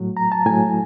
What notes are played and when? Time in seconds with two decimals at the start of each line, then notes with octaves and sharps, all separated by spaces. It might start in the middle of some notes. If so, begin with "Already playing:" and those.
Already playing: A2 F#3
0.17 A#5
0.32 A5
0.46 A2 F#3 G#5